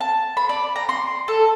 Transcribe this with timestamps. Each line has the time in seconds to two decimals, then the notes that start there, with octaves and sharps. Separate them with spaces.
0.01 A5
0.37 B5
0.49 D5
0.76 A#5
0.89 C6
1.28 A4